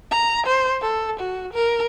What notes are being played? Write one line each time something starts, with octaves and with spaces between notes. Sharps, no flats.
A#5
C5
A4
F#4
A#4